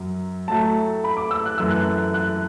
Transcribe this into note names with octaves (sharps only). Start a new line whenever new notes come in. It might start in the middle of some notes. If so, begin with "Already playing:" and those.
Already playing: F#2 F#3
A2 F#3 A3 A5
B5
D6
E6
F#6
F#2 E3 A3 E6
F#6
F#6